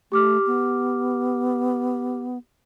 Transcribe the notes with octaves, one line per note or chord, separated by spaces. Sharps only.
A3 G4 D6 F6
B3